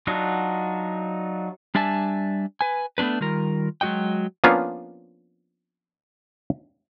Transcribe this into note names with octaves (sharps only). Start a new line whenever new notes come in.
F#3 D4 D#4 F4 F#4
G3 D4 D5 E5 G#5 A5
B4 G#5
A3 B3 C#4 D4 B4
D#3 G3 F4 A#4
F#3 G#3 F#4 D#5 G5
F3 A#3 B3 C#4 D4 F4